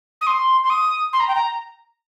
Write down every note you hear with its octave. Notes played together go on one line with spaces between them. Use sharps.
D#6
C6
C6
D#6
C6
A#5
G5
A#5